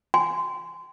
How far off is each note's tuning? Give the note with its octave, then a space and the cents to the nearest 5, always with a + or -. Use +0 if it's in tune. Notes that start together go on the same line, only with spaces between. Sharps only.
G#5 +0 C6 -25